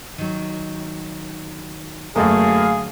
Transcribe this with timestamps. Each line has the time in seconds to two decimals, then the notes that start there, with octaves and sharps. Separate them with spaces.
0.18 D#3 F#3
2.16 F#2 D3 F#3 A3 A#3 G#4 F5